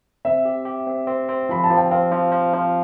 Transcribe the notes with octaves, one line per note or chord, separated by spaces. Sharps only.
C4 E5
G4
G4
C4
C4
C4
F3 B5
A5
F3
G5
C4 F5
F3
F3
F3